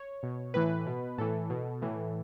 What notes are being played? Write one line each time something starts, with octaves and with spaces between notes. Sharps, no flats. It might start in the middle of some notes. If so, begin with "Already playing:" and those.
Already playing: C#5
B2
A2 E3 B4
B2
A2 E3 A4
B2
A2 E3